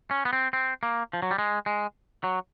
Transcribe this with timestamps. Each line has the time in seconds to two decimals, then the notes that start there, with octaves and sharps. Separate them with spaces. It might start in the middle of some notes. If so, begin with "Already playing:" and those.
0.11 C#4
0.25 B3
0.33 C4
0.53 C4
0.83 A#3
1.13 F3
1.22 F#3
1.31 G3
1.38 G#3
1.66 G#3
2.24 F#3